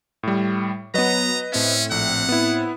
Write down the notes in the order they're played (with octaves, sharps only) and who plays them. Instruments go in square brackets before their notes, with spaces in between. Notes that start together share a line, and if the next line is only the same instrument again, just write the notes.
[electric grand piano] A2 G3
[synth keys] F#3 B3 [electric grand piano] B4 D#5 [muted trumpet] A#5
[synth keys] A2 C4 E5 [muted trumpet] C#4
[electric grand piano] A#1 [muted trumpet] F#5
[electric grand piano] B3 E4